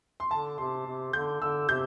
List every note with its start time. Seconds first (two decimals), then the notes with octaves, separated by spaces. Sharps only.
0.20 C6
0.30 D3 A5
0.58 C3 C6
0.86 C3
1.13 D3 G6
1.41 D3 E6
1.68 C3 G6